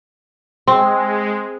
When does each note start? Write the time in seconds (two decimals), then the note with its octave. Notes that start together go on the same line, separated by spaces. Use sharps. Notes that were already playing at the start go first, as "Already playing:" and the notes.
0.68 G#3 C4 C6